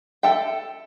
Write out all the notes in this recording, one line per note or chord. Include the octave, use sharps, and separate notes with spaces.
A4 E5 G5